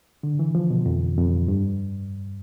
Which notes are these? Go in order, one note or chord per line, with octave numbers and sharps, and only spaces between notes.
D3
E3
F3
B2
F2
F2
G2